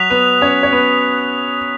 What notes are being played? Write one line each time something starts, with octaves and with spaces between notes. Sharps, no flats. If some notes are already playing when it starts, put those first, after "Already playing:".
Already playing: F#3 F#4 D#6 F#6 B6 F7
B3 B4
C#4 C#5
C#5
B3 B4